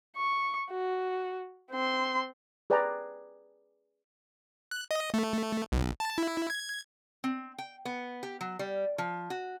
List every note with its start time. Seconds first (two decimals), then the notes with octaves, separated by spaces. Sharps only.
0.17 C#6
0.71 F#4
1.72 C4 C6
2.70 G#4 B4 D5 G5 G#5 A#5
4.71 F#6
4.91 D#5
5.14 A3
5.72 B1
6.00 A5
6.18 E4
6.50 G#6
7.24 C4
7.58 G5
7.85 B3
8.23 G4
8.41 F#3
8.59 G3
8.98 F3
9.30 F#4